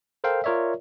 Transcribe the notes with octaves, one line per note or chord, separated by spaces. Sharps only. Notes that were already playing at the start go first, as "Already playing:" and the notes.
A4 A#4 C5 F5 G5
F4 A#4 C#5 D5 E5